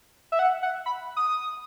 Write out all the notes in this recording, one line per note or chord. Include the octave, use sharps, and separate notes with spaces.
E5
F#5
F#5
B5
D#6